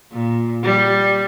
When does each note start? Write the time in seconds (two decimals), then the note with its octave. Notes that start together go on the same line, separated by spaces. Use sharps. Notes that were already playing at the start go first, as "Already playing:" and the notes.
0.12 A#2
0.63 G3